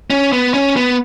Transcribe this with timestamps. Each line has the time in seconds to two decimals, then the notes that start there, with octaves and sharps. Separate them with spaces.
0.10 C#4
0.32 B3
0.54 C#4
0.76 B3